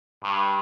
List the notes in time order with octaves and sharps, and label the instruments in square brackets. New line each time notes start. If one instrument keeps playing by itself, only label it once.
[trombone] G2